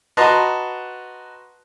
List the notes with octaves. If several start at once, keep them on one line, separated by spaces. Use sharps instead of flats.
F#4 B4 D#5 A5 A#5 C6